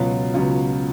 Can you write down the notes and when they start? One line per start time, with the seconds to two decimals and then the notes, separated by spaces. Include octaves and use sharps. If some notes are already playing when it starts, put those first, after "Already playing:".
Already playing: C#2 B2 F#3 C#4 F4
0.34 C#2 B2 F#3 C#4 F4